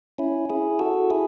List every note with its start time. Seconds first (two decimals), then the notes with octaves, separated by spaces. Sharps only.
0.18 C#4 E4
0.49 E4 G#4
0.79 F#4 A4
1.10 E4 G#4